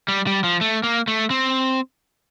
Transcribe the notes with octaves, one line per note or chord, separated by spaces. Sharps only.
G3
G3
F3
A3
A#3
A3
C4